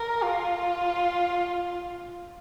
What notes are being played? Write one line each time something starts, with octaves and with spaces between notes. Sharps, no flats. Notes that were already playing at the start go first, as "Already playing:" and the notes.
Already playing: A#4
F4